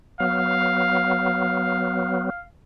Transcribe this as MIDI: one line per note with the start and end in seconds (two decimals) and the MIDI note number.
0.20 2.30 54
0.20 2.30 59
0.20 2.42 77